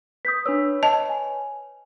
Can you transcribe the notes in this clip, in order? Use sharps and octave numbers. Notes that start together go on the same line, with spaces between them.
B4 D#6 G6 B6
D4 B4 C#5 E6
D#5 A5
G#5